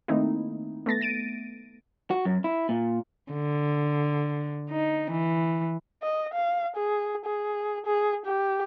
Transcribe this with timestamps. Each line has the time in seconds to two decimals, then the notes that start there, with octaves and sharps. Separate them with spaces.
0.08 D#3 A3 A#3 C4 D#4 E4
0.86 A3 B3 A6 A#6
1.01 A6 D7 D#7
2.11 F#4
2.25 F#2
2.44 E4
2.69 A#2
3.32 D3
4.70 D#4
5.11 E3
6.02 D#5
6.34 F5
6.76 G#4
7.25 G#4
7.86 G#4
8.25 G4